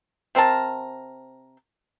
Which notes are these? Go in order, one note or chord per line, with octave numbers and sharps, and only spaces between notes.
C3 C4 A#4 A5